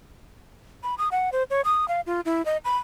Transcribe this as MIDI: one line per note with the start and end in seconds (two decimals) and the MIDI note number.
0.83 0.95 83
0.98 1.08 87
1.12 1.30 78
1.32 1.43 72
1.50 1.61 73
1.65 1.88 87
1.88 2.01 77
2.07 2.21 65
2.25 2.44 64
2.46 2.57 75
2.65 2.78 83